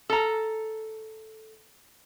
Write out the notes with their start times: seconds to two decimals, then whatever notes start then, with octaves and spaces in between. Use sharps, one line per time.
0.09 A4 A#5